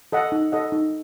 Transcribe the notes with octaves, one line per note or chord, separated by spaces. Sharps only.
A4 D#5 F#5
D#4
A4 D#5 F#5
D#4